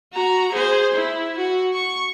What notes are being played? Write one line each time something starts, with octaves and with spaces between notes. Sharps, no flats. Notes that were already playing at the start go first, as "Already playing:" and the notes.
F#4 A#5
G#4 C5
E4
F#4
C#6